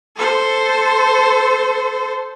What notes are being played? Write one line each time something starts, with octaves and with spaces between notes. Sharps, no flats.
A4 C5